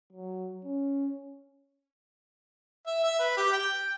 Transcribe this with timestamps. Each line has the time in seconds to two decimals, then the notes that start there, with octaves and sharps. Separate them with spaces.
0.13 F#3
0.65 C#4
2.86 E5
3.04 E5
3.19 B4
3.37 G4
3.53 G5